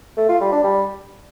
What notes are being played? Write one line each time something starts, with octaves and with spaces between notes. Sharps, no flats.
A3
F4
G3
D4
G3